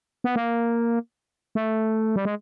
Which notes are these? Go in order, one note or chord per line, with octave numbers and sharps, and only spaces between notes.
B3
A#3
A3
G3
G#3